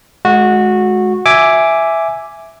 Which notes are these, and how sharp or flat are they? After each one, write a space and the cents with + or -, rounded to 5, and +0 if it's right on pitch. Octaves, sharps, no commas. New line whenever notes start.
G#3 +30 F#4 -15
E5 +0 G#5 +0 D6 +0